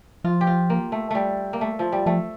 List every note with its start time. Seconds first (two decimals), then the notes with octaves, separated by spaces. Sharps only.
0.24 F3 F4
0.41 G4
0.47 F4
0.70 A#3
0.92 A3
1.11 G3 A3
1.53 A#3
1.61 A3
1.79 F3
1.92 G3
2.06 F3 A3